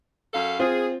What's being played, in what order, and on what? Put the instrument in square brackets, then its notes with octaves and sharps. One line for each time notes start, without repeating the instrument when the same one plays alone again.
[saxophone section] F#2 A4 F5
[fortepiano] C4 F4 [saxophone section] G#4